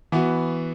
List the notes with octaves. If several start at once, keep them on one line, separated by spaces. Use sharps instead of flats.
E3 B3 F#4